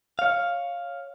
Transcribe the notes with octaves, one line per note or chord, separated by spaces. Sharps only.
C#5 F5